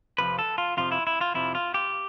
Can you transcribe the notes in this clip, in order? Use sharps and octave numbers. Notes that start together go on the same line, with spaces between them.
F2 C3 F3 B4
A4
F4
F2 C3 F3 F4
E4
E4
F4
F2 C3 F3 E4
F4
G4